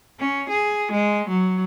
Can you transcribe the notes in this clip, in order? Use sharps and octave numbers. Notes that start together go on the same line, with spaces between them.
C#4
G#4
G#3
F#3